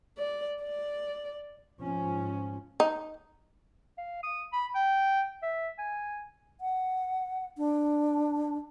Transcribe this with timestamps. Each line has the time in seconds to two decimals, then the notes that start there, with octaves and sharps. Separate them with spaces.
0.18 D5
0.63 D5
1.81 G#2 F3 C#4
2.80 D#4
3.98 F5
4.23 D#6
4.53 B5
4.75 G5
5.42 E5
5.78 G#5
6.61 F#5
7.58 D4